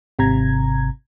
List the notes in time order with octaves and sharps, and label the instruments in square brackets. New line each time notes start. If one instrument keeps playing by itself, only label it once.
[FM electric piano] G#1 C3 A#5 G#6